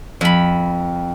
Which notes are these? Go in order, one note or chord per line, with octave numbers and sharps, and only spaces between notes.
F2 B5